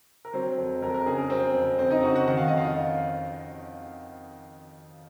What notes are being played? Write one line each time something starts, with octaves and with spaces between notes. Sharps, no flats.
A#4
F#3 C4 C5
F2
F2 A#4
A#4
C#3 G#4
A#4
F#3 C4 C5
F2
F2 C4 C5
D#4 D#5
C#3 F#4 F#5
F#4 F#5
D#3 F#5
F5
F2 D#5
F4 F5